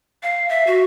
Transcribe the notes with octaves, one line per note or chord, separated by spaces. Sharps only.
F5
E5
F#4